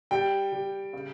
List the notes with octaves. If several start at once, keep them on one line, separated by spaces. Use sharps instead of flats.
G3 G5
G3
C#3